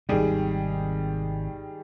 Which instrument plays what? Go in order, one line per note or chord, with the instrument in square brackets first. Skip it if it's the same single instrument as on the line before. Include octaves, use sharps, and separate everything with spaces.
[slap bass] G#1 C3 [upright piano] D#3 G3 G#4